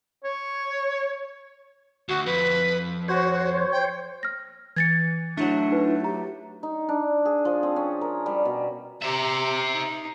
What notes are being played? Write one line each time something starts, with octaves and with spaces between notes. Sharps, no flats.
C#5
D2 F#4
F2 B4
F#4 C5 C#5
G5
F6 A#6
E3 G#6 A6 C#7
F#3 A3 D4 E4
D#4 B4
G4 A#5
D#4
D4
G#4
F3
C4
C#4
A#4
G3
B2
C3 C5 E5 A#5
D#4